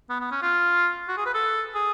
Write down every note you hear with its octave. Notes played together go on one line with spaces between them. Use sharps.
B3
B3
C#4
F4
F#4
G#4
B4
A4
G#4